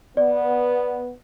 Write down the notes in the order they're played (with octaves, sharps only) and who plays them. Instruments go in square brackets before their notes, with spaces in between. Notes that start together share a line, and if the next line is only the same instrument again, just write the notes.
[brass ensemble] B3 [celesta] D5